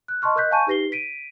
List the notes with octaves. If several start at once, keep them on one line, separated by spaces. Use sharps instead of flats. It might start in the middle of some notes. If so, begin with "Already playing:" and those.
F#6
D#5 A5 C6 C#6 F6
A#4 D#5 F#6 G6 B6
F5 G#5 A5 C#6 G6 D#7
D#4 G4 B4 A#6 C7 G7
B6 D7 D#7